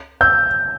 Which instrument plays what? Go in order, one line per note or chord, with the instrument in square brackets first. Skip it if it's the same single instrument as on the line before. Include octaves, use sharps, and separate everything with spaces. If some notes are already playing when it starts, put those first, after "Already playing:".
[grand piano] E6 G6